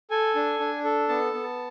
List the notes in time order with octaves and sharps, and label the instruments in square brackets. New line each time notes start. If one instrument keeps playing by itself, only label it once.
[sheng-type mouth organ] A4 G#5
D4
D4
A4
B3 A5
B3